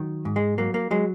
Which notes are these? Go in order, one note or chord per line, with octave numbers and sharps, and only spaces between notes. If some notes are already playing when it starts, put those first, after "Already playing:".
Already playing: D#3 F#3
G#2
G#3
F#3 A#3
A#3
F#3 G#3